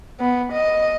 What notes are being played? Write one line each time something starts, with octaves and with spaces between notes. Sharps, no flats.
B3
D#5